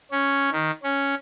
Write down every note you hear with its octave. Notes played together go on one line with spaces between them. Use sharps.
C#4
D#3
C#4